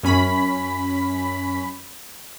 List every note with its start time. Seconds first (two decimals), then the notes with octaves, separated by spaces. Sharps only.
0.03 F#2 C#4 B5 B6